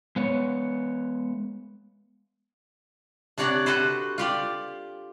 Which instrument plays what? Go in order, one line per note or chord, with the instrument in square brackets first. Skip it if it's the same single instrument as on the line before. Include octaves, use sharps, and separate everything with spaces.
[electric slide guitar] G#3 B3 C#5
[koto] C3 D4 C#5 D5 F#5 A#5
F#4 A4 B4 C5
F4 G4 D5